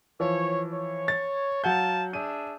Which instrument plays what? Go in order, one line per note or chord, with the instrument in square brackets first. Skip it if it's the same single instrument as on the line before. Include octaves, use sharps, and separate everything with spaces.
[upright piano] E3 F3 [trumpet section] C#5
[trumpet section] C#5
[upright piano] A6
[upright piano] F#3 F#5 G6 [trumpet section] F5 A5
[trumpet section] D4 G#4 E5 [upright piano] D#7